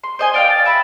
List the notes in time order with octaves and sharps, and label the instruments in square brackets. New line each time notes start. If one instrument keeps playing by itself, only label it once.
[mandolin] C6
C5 D#5 G#5
[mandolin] D5 F5 G5 [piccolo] D7
[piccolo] A6
[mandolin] E5 A5 [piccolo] B5